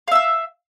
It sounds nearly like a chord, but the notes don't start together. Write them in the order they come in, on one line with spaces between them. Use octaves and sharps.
F5 E5 E6